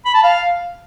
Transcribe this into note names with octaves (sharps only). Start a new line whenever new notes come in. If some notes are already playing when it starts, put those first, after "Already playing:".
B5
A5
F5